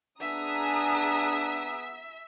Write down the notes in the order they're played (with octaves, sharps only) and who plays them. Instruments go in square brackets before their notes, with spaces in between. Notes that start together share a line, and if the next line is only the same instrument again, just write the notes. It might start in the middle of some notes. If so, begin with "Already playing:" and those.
[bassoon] B3 [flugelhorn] D4 [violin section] G#4 A#5 D#6 [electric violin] E5